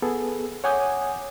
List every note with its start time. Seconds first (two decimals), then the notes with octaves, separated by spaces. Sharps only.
0.02 B3 G#4 A4
0.64 C#5 F#5 G#5 D6 D#6 G6